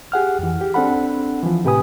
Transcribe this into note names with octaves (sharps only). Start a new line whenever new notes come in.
G4 G#4 F#5 F6
F2 E3
G4
C4 D4 A4 F#5 B5
E3 F3
A2 C3 G4 B4 G#5 D#6